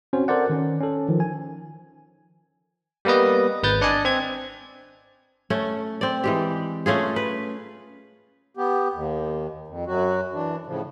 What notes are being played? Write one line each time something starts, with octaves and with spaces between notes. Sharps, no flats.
C4 C#4 F#4 C5
A4 A#4 C5 D5 F#5
D#3 C#4
C#4 A4
D#3 F3
G#5
G3 A#3 B3 B4 D#5
G#1 B4 G6 A6
D4 D5 D#5 G#5
C4 G#6
A3 C#4
C4 D5
E3 G#3 G4
A3 C#4 F4 G#4
B4
B3 G4
D#2
F2
F#2 F#3 F#4
E3 D4
A2 C#3 F3